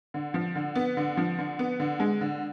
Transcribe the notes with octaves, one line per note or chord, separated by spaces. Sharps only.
D3
F3
D3
B3
D3
F3
D3
B3
D3
G#3
D3